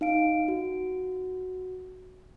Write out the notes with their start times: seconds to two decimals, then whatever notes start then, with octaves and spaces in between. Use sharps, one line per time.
0.01 D#4 F5 D7
0.48 F#4